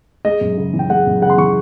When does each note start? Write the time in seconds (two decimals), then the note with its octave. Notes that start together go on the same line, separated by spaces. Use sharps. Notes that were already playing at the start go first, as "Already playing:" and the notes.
0.25 G#3 D#5
0.41 F#2
0.57 C#3
0.73 E3
0.79 G5
0.90 G#3 F#5
1.07 F#2
1.22 C#3 F#5
1.30 C6
1.38 E3 C#6